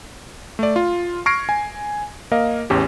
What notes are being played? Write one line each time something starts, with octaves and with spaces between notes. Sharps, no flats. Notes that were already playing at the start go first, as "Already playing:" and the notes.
A3 D5
F4
C#6 F6 G#6 A#6 C7 D7
G#5
A#3 A#4 D#5 F5
A1 E2 C#4 G4